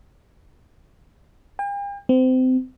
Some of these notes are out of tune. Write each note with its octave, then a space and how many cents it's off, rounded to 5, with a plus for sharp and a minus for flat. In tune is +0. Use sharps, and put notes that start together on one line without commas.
G5 +45
C4 -30